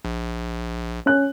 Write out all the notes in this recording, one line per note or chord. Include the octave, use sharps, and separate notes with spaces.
A#1
C#4 F#6